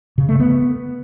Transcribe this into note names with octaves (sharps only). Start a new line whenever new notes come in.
C#3
A3
B3